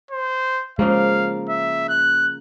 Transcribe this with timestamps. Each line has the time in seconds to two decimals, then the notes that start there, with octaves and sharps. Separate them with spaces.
0.11 C5
0.79 C#3 F3 G#3 A#3 F5
1.49 E5
1.88 F#6